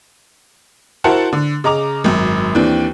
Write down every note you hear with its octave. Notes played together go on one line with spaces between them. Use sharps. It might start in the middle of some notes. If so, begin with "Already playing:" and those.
E4 F#4 A#4 C5 F#5 A5
D3
C#3 D#5 A#5 D6 F7
G#1 F#2
D#2 E3 C4 D4